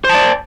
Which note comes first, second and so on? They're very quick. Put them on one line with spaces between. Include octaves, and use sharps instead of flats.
C5 A5 D5